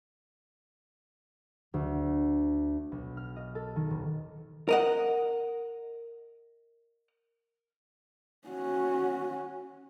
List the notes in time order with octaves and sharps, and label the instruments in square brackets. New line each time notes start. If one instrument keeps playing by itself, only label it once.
[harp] D2
B1
F6
D#5
A4
D#3
D#1
[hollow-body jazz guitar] A#4 D#5 F#5
[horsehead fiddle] C#4 F#4